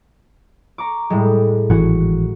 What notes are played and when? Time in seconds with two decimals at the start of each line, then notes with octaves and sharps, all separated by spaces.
0.78 A#5 C#6 D6
1.10 A2 G3 G#3
1.70 G#1 E3 F#4